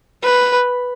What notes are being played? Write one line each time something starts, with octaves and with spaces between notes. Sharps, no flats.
B4